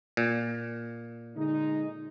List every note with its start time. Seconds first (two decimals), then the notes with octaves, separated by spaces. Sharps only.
0.17 A#2
1.36 D3 G#3 D#4